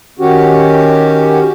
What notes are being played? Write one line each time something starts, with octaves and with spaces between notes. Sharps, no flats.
D#3 C#4 F#4 G4